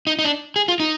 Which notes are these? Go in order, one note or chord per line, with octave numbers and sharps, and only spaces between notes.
D#4
D#4
D4
G#4
F4
D#4